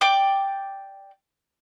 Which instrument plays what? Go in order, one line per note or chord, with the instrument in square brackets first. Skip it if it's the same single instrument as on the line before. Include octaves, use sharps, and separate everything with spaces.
[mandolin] D5 G5 D6